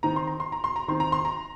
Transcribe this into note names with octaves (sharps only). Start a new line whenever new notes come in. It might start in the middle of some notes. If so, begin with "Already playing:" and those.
D#3 C4 D#4 A#5
C6
A#5
C6
A#5
C6
A#5
D#3 C4 D#4 C6
A#5
C6
A#5